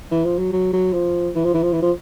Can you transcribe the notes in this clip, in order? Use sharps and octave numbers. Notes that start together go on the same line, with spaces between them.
E3
F3
F#3
F#3
F#3
F3
E3
F3
E3
F3
E3
F3